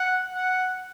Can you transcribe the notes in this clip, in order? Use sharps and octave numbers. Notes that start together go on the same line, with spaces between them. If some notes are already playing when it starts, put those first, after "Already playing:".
Already playing: F#5
F#5